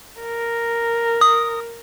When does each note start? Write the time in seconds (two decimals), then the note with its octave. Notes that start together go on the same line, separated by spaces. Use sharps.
0.21 A#4
1.21 D#6